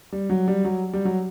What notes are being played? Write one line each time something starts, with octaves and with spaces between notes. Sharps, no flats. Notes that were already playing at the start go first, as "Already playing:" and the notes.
G3
F#3
G3
F#3
G3
F#3